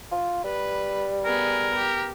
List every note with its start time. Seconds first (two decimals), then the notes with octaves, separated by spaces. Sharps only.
0.12 F4
0.44 G3 B4
1.25 B3 G#4 A#4
1.76 G4